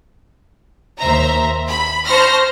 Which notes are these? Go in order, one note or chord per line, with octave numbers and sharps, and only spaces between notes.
D#2 C5 E5 A#5
B5
C5 A5 C6 C#6 F6 A#6